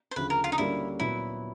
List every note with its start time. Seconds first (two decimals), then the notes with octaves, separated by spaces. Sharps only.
0.11 C5
0.16 D2 C#3 F3 B4
0.30 A#4
0.44 F4
0.52 D#4
0.58 D3 G3 A#3 C#4 E4 F#4
1.00 A#2 F#3 B3 E4